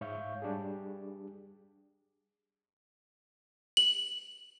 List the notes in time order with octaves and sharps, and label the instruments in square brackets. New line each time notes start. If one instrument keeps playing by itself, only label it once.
[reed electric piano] G#2 C#5 E5 F5 C#6 G6
G3 D4 G4 G#4
[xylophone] F#7